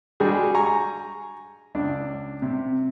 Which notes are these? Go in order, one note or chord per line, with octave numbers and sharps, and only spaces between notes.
G3 G#3 D4 F#4 G#4
G#5 A#5 C#6
C#2 D4
C3